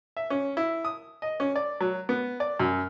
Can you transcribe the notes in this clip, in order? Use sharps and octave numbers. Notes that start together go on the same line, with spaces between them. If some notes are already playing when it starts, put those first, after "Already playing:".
E5
C#4
E4
D#6
D#5
C#4
D5
F#3
B3
D5
F#2